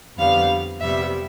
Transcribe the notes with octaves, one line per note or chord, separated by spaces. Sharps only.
F2 D3 G3 B3 F5
F2 C3 G3 B3 E5